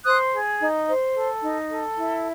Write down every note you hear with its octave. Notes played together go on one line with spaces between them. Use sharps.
C5 D#6 F#6
G#4
D#4
C5
A4
D#4
A4
E4